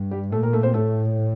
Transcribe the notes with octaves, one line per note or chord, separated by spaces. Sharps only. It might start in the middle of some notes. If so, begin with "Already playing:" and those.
Already playing: G2
G3 G4
A#2 A3 A4
A#4
A3 A4
C4 C5
A2 A3 A4